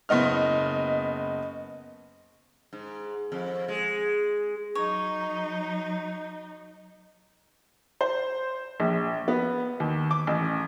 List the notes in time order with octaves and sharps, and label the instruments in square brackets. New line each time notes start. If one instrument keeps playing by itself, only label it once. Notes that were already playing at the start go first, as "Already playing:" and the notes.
[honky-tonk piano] F#1 B3 D#5 F6
[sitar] G#2
F2
G#3
[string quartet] F#3 D#4 [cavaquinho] C#5
[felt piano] C5
A#1
B3
D#2
D6
A1